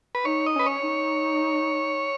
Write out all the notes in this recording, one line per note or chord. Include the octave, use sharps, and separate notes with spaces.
B4
D#4 C#5
D#5
C#4 B4
C#5
D#4